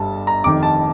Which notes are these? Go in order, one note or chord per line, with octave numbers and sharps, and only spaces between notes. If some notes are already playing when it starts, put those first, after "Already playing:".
Already playing: G1 G2 A5
A#5
F1 F2 D#3 D6
A5